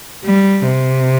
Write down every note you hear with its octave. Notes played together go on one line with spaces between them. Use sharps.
G3
C3